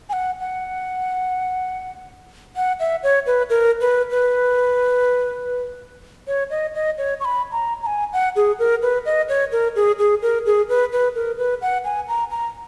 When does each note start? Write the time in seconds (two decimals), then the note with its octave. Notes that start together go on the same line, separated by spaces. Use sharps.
0.09 G#5
0.13 F#5
0.40 F#5
2.56 F#5
2.80 E5
3.03 C#5
3.27 B4
3.50 A#4
3.81 B4
4.10 B4
6.28 C#5
6.50 D#5
6.74 D#5
6.98 C#5
7.20 C#6
7.25 B5
7.52 A#5
7.83 A#5
7.86 G#5
8.13 F#5
8.36 G#4
8.59 A#4
8.82 B4
9.06 D#5
9.29 C#5
9.52 A#4
9.76 G#4
9.99 G#4
10.22 A#4
10.46 G#4
10.69 B4
10.92 B4
11.15 A#4
11.38 B4
11.62 F#5
11.85 G#5
12.08 A#5
12.31 A#5